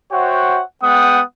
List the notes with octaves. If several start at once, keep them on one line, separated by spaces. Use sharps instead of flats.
F#4 C5 C#5 E5 F#5 G5
G#3 B3 F#5 G5 D#6